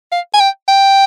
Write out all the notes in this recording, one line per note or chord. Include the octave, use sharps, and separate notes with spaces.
F5
G#5
G5
G5